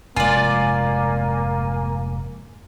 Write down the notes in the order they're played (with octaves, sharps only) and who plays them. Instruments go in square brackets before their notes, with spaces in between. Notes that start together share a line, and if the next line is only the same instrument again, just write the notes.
[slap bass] F1 G#2 G#3 [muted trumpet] A#3 [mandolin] F4 D5 [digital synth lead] G#5